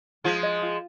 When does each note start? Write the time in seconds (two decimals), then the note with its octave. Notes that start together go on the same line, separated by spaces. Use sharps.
0.24 F3 G#3 F4
0.43 D#5
0.62 F4